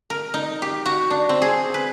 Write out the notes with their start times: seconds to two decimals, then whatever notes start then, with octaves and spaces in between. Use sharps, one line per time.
0.10 A#4
0.34 D#4
0.62 G4
0.86 F#4
1.10 D4
1.29 C4
1.42 G#4
1.74 B4